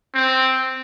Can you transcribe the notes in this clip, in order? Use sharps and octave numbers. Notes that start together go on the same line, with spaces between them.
C4